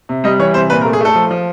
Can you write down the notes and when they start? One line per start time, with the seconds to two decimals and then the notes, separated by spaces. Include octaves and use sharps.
0.09 C3
0.24 G3 D#5
0.39 E3 C#5
0.54 C3 C5
0.70 A#2 B4
0.81 A#4
0.85 A3
0.93 G#4
1.01 A3 A4
1.15 F3
1.31 F3